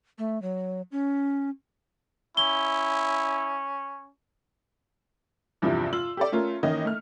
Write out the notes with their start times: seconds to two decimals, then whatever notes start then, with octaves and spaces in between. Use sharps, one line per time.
0.18 A3
0.42 F#3
0.92 C#4
2.37 C#4 E4 G7
5.62 E2 G2 C3 F3 E4
5.93 F4 E6 F#7
6.17 G4 A4 D5
6.32 A3 C#4 F4 A#4
6.63 D#3 E3 A#3 C#4 E4 D#5
6.85 A3 F6